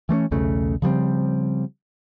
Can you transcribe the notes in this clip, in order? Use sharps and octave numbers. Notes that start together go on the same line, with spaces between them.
E3 A3 A#3 C#4
B1 E2 C#3 A3
C#3 F3 G3 C4